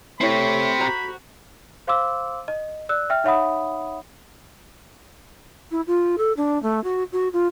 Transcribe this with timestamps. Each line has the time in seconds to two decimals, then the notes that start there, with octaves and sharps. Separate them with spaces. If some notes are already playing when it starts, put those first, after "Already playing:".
0.21 A3 C4 E4 G4 C#5 B5
0.80 F#4 C5 A#5
1.87 C5 F5 C6 D6 E6
2.48 D#5
2.89 D5 E6 F#6
3.10 E5 G5 F6
3.24 D#4 C#5 E5 F#5 B5 D#6
5.71 E4
5.87 F4
6.18 A4
6.37 D4
6.62 A3
6.84 F#4
7.12 F#4
7.33 F4